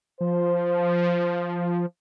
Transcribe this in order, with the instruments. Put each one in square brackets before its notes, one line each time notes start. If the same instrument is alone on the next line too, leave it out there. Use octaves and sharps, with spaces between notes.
[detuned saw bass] F3 [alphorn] C5